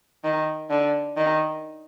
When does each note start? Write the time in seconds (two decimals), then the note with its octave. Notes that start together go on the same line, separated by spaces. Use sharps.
0.24 D#3
0.70 D3
1.17 D#3